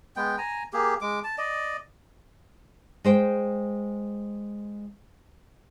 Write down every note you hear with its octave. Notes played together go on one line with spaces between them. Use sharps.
G#3 B3 G5
G#5 A#5
A#3 G4 G#4
G#3 D6
A5
D5 D#5
G#3 C5 G5